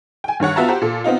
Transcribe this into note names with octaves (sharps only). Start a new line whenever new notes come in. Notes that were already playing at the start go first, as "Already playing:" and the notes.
G5 G#5
G2 D#3 C#5 F#5
B3 F4 F#4 E5 A5 A#5
F#4 G4 C5
A#2 A4
B3 C4 D#4 F4